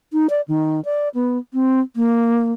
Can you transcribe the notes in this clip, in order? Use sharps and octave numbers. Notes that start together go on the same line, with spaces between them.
D#4
D5
D#3
D5
B3
C4
A#3